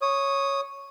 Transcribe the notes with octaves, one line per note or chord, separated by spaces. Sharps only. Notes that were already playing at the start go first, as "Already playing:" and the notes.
C#5 D#6